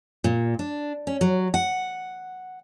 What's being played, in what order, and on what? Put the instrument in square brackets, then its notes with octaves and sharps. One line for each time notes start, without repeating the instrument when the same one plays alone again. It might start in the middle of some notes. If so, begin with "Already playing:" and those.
[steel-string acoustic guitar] A#2
D4
C#4
F#3
F#5